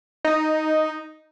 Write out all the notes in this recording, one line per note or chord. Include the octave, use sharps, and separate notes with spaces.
D#4